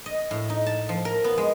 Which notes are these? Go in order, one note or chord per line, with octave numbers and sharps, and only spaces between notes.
D#5
A2
D#4
A5
F3
A#4
B3
G#3